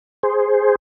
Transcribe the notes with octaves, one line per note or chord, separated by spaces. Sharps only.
G#4 C5